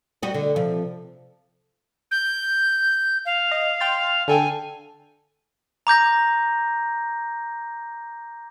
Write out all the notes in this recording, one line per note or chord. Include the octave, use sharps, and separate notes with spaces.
G3 F#4 D#5
D3
C3 F3
G6
F5
D#5
G5 C6 A6
D3 A4 G5 G#5
A#5 D6 G6 A#6